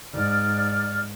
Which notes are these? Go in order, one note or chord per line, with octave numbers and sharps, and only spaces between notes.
G#2 D5 F6